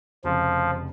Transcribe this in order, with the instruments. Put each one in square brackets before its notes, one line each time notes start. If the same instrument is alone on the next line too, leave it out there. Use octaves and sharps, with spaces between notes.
[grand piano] F1 F2 C#3 [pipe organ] F3